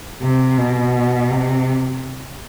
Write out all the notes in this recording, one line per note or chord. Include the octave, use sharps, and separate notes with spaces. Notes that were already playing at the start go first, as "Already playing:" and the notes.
C3
B2
C3